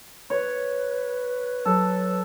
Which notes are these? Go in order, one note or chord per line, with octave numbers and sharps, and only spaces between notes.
B4 C#5
F#3 A4